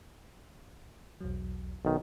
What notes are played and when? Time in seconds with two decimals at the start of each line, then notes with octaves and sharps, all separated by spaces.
1.21 B1 E2 F#3
1.85 B1 D#3